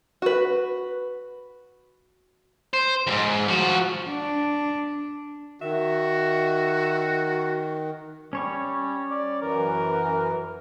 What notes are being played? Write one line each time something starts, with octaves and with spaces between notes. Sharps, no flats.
F#4 B4
C5
F2 G#2
F3 F#4
D4
D#3 F#4 E5
G3 C#4 C#5 C#6
D5
F#2 E3 A#4